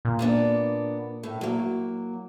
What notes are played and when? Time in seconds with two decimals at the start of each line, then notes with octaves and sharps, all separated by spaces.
0.05 A#2
0.19 A#3 B3 D4
1.23 A2
1.41 F#3 A#3